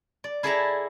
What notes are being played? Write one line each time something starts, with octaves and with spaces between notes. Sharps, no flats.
D5
E4 G#4 A4 D5 E5 A#5